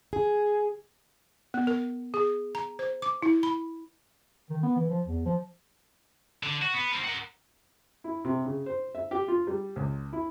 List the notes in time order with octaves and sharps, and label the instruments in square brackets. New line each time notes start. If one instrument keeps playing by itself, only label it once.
[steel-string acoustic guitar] G#4
[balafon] B3
A#4
G#4
A#5
C5
D6
E4
B5
[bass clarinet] D#3
B3
E3
F3
E2
F3
[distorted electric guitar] D3
F#4
B3
C4 A#4
A#4 F#5
[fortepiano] E4
C3
C#3
C5
E5
G4
F4
G3
C#2
E4